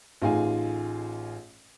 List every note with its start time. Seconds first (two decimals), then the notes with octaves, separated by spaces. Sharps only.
0.22 A1 D#4 F4 G#4 G#5